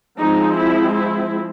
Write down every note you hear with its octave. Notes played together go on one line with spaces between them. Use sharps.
F3 G#3 C4 D#4
E4
E4